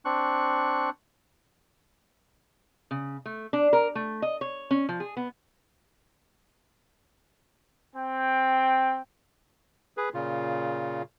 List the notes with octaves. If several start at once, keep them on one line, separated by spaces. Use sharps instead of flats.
C4 D4 C#6 F#6
C#3
A3
D4
A#4
A3
D#5
C#5
C#4
F3
G#4
B3
C4 G5
G#4 B4
A#2 C#3 F4